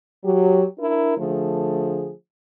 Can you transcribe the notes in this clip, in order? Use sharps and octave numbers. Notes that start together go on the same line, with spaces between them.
F#3 G4
D4 E4 A#4
D3 F3 A3 G#4